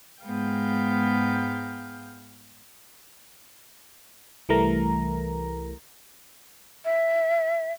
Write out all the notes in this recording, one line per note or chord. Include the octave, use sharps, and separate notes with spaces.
G#2 G#3 B3 F5 G5 G6
C2 E3 G3 A3 A#4 A#5
E5